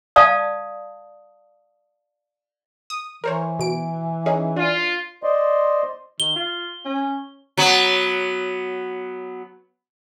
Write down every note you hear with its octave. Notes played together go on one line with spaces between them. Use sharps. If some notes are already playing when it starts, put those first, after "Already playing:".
D5 F5 A5 D#6
D#6
E3 A#4 C5 C#5
B2 D7
C#4 D#4 G#4
D4 F4
C5 D5 D#5 C6
D#3 G7
F4
C#4
F#3 B3